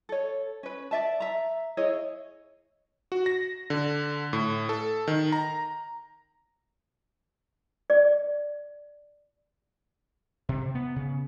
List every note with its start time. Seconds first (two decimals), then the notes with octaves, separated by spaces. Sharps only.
0.09 A4 C#5
0.63 C#4 B4
0.91 D5 E5 A5
1.20 E5 A#5
1.77 E4 G#4 C#5 D#5
3.12 F#4
3.26 A#6
3.70 D3
4.33 A2
4.69 A4
5.08 D#3
5.32 A#5
7.90 D5
10.49 C3
10.75 B3
10.96 C#3